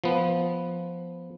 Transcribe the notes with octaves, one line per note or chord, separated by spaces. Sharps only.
F3 B3